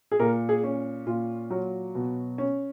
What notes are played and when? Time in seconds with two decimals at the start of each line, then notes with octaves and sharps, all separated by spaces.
0.11 G#4
0.19 A#2 A#4
0.49 G#4
0.63 C#4
1.07 A#2 F4
1.50 F#3
1.95 B2
2.38 C#4